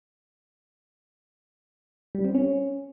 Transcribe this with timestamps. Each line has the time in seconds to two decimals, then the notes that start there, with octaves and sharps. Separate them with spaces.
2.15 G3
2.25 C4
2.35 C#4